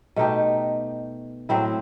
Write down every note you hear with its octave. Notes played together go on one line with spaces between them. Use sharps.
B2 A3 D#4 G4
A2 F#3 C4 E4